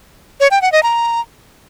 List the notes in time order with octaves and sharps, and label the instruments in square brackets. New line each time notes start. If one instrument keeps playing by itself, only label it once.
[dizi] C#5
G5
F#5
D#5
A#5